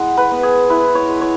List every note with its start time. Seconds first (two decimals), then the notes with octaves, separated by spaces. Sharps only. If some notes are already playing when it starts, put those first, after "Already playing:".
Already playing: G#3 E4 F#5
0.17 B4
0.31 B3
0.43 G#4
0.70 E4 B4
0.95 C#5
1.09 G#3
1.21 C#5